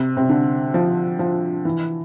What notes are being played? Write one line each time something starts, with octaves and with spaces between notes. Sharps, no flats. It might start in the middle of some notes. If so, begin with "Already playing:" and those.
Already playing: C3
C3
D3
F3
F3
E3